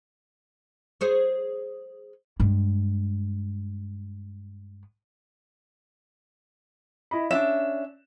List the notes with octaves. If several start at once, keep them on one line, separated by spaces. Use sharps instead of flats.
G#4 C5 C#5
G2 G#3
E4 D#5 B5
C#4 D4 F4 E5 E7